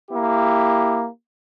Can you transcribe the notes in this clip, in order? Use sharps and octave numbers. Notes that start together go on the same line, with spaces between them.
A#3 E4 G4